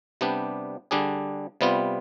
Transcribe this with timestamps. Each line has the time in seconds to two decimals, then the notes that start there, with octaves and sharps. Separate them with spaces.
0.21 C3 G3 B3 D4 G4
0.91 D3 G3 D4 G#4
1.61 C3 G3 B3 F4